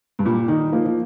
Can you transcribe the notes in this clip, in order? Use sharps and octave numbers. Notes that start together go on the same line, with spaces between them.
G2
A#2 G3
D#3 D#4
F3 A#3
F3